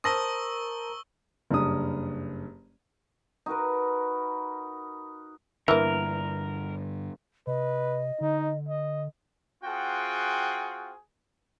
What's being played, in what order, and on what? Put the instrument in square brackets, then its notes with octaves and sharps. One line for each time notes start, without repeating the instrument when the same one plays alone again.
[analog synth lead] A#4 [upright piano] C5 A5 A#6 [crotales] C#6 E6 G7 [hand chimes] D#6
[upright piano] F#1 G2 D#6
[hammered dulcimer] D#4 F#4 A#4 B4
[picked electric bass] G2 D3 [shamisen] E3 A#3 [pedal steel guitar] A#4
[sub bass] C3 [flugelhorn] B4 [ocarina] D#5
[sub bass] D3 [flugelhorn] D#4
[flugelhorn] D#5
[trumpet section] C4 F4 F#4 G#4 F#5 G5